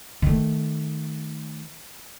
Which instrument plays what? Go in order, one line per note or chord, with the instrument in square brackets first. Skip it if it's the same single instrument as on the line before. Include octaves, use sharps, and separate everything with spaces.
[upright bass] D#3 A3